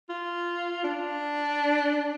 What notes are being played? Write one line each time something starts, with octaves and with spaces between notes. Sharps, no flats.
F4
D4